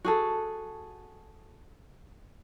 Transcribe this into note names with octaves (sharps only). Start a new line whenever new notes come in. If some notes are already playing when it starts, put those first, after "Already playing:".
F#4 G#4 A4